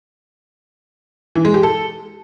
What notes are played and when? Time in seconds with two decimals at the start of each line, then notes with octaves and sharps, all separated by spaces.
1.35 E3
1.45 G#3
1.54 G4
1.63 A4